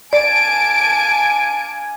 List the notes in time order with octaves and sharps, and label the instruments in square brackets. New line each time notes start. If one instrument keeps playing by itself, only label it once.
[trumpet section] A#3 D4 G#5 [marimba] D5 [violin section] A5 D7